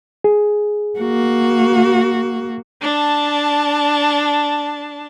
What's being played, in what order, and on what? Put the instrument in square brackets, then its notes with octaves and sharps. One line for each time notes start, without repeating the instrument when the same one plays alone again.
[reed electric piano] G#4
[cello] A#3 F#4
[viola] D4 A5